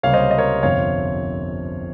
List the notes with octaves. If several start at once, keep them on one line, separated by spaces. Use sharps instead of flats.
C#2 C3 G3 A#3 C#5 F5
C5 D#5
C#5
D#5
A#4 C#5
G1 F2 C3 F3 C4 C#5 F5